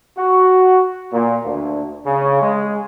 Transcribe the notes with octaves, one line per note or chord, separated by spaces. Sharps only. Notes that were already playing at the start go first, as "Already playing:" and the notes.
F#4
A#2
D2
C#3
G#3